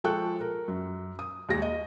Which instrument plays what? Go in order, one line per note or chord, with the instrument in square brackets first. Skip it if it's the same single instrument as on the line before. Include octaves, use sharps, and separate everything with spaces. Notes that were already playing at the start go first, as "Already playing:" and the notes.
[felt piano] F3 G#3 A4 G5 C#6 F#6
A#4
F#2
D#6
D#2 G3 G#3 A#6
D#5